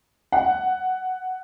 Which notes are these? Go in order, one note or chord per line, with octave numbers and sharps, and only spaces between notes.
F#5